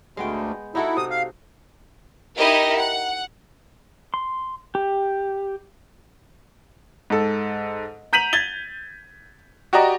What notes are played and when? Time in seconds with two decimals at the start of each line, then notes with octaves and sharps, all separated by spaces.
0.17 D2 G#3 B3 G5
0.75 D#4 E4 F#4 A4
0.97 C3 D#6
1.10 F5
2.36 D#4 E4 G4 A#4 D#5
2.77 F#5
4.14 C6
4.75 G4
7.10 G#2 A4
8.13 A#5 G6 B6 D#7 F7 F#7
8.33 G#6 A6 G7
9.73 F#4 G4 D5 D#5 A#5